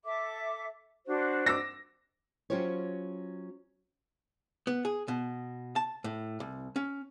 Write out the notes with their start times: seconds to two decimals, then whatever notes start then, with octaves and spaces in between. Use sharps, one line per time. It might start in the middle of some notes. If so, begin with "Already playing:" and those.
0.04 A4 E5 D6
1.06 D4 F#4 C5
1.46 D6 E6 A#6
2.50 F#3 C#4 F4 G4 C5 C#5
4.67 B3
4.85 G#4
5.08 B2
5.76 A5
6.04 A2
6.40 C2
6.76 C#4